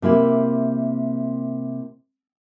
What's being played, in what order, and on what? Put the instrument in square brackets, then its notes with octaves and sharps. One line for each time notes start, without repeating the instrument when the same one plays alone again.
[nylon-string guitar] C3 A#3 E4 G4